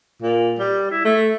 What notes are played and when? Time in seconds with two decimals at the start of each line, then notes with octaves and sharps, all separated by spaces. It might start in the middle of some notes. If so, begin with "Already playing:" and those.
0.22 A#2
0.59 G3
0.91 E4
1.05 A3